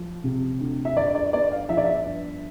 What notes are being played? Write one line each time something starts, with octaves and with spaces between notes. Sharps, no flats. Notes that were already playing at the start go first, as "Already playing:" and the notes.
Already playing: F3
C3
D2
E5
G1 D5
D5
B3 D5
F5
F3 E5
D5
E5
G2